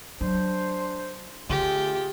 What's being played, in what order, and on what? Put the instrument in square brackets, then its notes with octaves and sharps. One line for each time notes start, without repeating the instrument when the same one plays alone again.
[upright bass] F#3 [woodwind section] D4 C5
[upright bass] D3 [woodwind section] A3 F4 G#4 [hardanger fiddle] G4